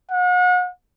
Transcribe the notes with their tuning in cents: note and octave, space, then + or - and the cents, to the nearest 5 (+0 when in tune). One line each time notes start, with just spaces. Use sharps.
F#5 -40